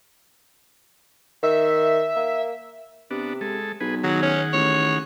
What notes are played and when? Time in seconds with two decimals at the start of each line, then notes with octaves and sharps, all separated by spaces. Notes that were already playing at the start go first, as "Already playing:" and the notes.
1.43 D#3 E5
2.16 A#3
3.11 C3 B3 D4
3.41 G#3 A4
3.80 B1 G#4 B4
4.04 D#3 F#3 G#4 F#5
4.23 C#4
4.53 A1 C#5